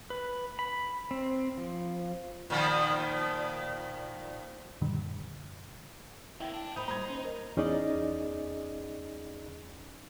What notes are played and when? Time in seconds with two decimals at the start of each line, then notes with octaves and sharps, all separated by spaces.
0.10 B4
0.59 B5
1.11 C4
1.58 F3
2.50 A#2 D#3 F3
4.81 F#2 A#2 D3 D#3 G3
6.40 A#3 C4 E4 G5
6.54 D4 G5
6.76 A2 D#4 C5 B5 D#6 G6
6.88 G3 A#3 A#5 B5 G#6
7.10 C#4
7.25 A#4 D#5
7.57 E2 C#4 D#4 G#4 D5 D#5